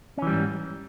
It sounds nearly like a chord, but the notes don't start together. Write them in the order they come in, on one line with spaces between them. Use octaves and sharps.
C#4 E3 G3 G#2